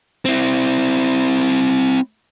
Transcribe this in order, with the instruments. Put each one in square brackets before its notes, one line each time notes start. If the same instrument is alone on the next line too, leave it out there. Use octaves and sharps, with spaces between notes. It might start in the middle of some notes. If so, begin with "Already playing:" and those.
[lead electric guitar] C4 E4